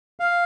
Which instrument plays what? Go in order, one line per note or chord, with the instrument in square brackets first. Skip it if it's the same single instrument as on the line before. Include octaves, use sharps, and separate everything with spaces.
[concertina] F5